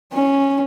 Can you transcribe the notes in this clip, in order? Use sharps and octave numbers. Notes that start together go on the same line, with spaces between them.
C#4